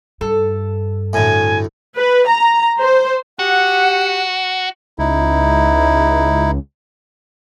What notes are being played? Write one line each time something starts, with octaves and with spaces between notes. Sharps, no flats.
G2 A4
D2 A2 G#5
B4
A#5
C5
F#4 G4 F#5
C#2 D#4 E4